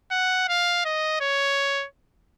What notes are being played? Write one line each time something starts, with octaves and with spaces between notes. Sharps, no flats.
F#5
F5
D#5
C#5